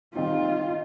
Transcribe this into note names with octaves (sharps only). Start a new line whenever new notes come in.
D#3 G3 C4 D#4 F4
D#4